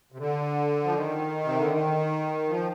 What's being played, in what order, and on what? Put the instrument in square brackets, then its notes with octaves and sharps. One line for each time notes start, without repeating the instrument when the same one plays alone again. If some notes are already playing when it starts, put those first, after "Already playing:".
[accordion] C3
D3
F3
D#3
C3
D3
D#3
F3